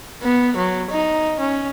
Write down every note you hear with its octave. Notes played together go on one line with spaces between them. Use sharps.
B3
F#3
D#4
C#4